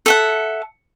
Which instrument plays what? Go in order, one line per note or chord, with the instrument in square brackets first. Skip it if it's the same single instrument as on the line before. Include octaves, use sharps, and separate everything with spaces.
[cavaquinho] A4 E5 F#5